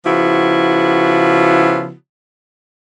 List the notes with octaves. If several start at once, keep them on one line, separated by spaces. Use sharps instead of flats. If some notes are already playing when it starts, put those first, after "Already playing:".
C#3 F3 B3 E4 F#4